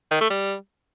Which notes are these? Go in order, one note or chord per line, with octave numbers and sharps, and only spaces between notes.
D#3
A3
G3